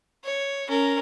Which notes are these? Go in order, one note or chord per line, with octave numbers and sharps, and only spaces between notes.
C#5
C#4 A#4